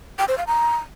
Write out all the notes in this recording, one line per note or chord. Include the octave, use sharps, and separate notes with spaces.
G5
C5
F5
A#5